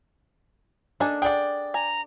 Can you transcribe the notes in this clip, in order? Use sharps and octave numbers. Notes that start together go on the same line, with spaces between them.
A#3 D4 D#4 A4 G#5
G#4 D5 F#5 G5
G#5 A#5